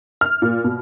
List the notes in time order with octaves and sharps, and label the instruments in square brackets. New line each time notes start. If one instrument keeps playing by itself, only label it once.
[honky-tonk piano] F6
A#2
B2